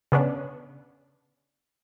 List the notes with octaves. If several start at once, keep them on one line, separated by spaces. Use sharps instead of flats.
C#3 B3 C#4 D4